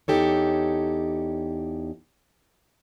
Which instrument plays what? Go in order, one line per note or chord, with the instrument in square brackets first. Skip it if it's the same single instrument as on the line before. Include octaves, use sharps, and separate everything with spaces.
[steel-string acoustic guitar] E2 A#2 D#4 G4 A4 C#5